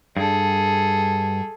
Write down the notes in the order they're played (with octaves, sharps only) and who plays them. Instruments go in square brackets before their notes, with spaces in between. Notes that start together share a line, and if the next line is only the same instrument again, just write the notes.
[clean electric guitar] G2 [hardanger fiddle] G#4 A4